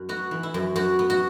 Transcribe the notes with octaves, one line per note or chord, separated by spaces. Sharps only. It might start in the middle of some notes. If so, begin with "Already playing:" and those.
Already playing: F#2
B3 F#4
E3
E4
F#2
F#2 F#4
B3
F#4